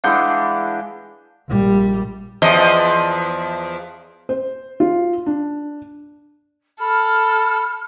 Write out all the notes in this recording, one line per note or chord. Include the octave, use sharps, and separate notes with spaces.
E3 G#3 D4 F5 F#5 G6
A#1 G3
E2 F3 D#5
C5
F4
D4
A4 B5 F6